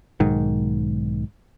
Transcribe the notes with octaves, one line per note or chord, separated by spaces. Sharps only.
B1 G#2 D#3